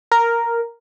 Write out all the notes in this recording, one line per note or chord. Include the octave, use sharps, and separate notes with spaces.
A#4